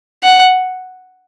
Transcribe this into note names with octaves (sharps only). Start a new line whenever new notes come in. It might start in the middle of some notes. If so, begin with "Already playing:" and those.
F#5